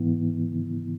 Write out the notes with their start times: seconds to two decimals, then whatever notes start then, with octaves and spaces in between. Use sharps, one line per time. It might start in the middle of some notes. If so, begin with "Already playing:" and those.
Already playing: G#2 E3 B3 E4